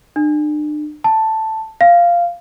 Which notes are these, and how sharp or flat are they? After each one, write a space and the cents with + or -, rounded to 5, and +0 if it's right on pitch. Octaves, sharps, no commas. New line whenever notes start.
D4 +40
A5 +5
F5 -10